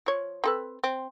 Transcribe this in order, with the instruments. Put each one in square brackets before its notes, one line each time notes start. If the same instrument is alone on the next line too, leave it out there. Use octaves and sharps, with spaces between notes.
[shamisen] F3 C#5
C4 A4 B4
C4